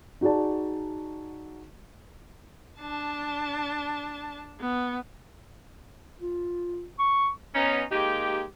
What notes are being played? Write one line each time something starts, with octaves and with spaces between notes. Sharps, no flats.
D#4 F#4 G#4 D5 A5
D4 A5
B3
F4
C#6
B3 C#4 D#4
G#3 A#3 D#4 G4